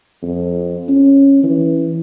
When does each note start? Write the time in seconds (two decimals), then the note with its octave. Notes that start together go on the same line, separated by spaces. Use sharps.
0.23 F2
0.88 C#4
1.43 E3